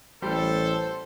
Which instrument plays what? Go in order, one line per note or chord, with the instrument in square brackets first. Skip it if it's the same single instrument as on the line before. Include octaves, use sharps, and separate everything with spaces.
[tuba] A1 [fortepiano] G3 [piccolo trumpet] A4 [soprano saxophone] C5